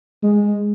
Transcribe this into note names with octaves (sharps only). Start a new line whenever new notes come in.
G#3